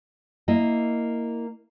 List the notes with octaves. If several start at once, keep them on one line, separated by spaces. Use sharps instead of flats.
A#3 E4 D#5